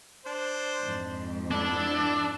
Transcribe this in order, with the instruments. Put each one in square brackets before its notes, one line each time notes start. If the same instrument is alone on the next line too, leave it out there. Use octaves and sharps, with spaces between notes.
[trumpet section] D4 C5
[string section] F2 G#2
[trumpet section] B3 E4 A4 [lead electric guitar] D4